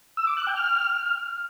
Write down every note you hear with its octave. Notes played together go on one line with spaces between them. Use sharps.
E6
D6
F#6
G5
F6